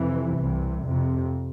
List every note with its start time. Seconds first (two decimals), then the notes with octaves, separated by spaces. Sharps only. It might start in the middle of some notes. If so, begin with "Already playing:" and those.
Already playing: F2 C3 E3
0.38 C2 C3
0.84 F2 C3